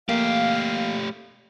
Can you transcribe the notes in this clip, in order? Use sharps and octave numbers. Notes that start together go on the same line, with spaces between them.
A3 A#3 G4 F5